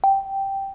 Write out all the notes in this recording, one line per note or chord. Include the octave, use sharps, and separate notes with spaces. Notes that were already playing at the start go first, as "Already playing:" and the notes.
G5